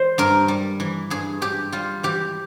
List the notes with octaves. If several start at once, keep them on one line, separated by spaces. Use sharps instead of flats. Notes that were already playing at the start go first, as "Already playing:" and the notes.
Already playing: E3 C5
G2 A#4
G3
E3
G2 G#4
G2 G4
G3 F4
E3 G4